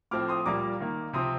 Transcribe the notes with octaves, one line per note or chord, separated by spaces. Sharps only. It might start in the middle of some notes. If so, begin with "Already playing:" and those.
A2 F3 C4 D6 F6
C6 D#6
A#2 G3 A#3 A#5 D6
D#3 A#3
C3 F3 C4 C6 D#6